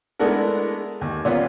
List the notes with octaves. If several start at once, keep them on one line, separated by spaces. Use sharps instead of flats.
G#3 A3 B3 D4 E4 A#4
D#2
A#2 B3 C#4 F4